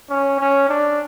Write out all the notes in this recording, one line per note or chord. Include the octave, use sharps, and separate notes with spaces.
C#4
C#4
D4